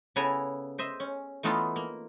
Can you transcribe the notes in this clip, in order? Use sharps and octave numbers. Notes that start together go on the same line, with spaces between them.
C#3 B3 E4 A4 G#5 A#5
C5 D#5 E5
C#4
E3 A3 B3 D#4 F4 A4
A#3